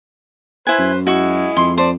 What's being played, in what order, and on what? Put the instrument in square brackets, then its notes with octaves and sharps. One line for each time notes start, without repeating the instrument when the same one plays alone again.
[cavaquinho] E4 G#5 [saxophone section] B4 C5
[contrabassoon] F#2
[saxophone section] G#3 E4 [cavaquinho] F#4 C#6
[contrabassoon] F2 [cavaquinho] C6
[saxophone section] A3 D5 [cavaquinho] C5